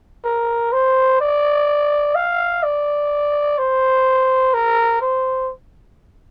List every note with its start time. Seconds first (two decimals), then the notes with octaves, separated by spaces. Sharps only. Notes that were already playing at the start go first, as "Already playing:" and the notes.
0.24 A#4
0.73 C5
1.20 D5
2.15 F5
2.63 D5
3.58 C5
4.54 A#4
5.01 C5